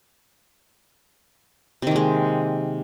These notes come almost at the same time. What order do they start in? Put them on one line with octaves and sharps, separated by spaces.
C3 D#3 A#3 G#3